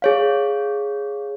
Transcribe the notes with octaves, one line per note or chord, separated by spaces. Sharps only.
G#4 C#5 F5